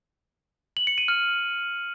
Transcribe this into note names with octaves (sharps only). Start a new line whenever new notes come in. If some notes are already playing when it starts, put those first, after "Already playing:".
F#7
C#7
D#7
F6